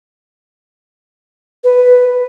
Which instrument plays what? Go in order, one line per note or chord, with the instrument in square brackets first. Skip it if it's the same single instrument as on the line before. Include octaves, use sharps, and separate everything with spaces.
[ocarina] B4